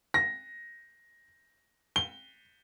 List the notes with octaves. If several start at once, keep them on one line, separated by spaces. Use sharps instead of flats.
A#6
G7